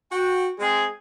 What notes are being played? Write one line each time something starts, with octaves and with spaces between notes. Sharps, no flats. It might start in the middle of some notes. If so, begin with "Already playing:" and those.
F#4 G5
G#3 C4 G#4